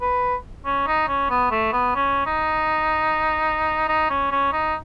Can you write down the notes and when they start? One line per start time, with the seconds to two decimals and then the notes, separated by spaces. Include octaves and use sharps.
0.01 B4
0.66 C#4
0.87 D#4
1.08 C#4
1.30 B3
1.51 A3
1.73 B3
1.95 C#4
2.26 D#4
3.89 D#4
4.10 C#4
4.31 C#4
4.53 D#4